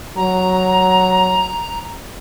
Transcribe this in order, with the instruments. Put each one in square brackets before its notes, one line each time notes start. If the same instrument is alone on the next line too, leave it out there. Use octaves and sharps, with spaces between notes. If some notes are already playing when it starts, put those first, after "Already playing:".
[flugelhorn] F#3 [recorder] A#5